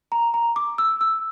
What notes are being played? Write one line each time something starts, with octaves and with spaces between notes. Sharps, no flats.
A#5
A#5
D6
E6
E6